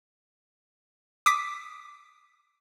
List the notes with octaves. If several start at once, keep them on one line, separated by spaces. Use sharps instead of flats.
D6 D#6 B6